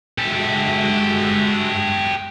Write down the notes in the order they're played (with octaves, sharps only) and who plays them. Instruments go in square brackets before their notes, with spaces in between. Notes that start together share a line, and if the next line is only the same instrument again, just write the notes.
[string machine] G#3 F#4 E5 [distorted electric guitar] G4 A4